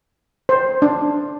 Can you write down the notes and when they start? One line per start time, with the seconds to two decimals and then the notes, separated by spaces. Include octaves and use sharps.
0.49 C5
0.82 D4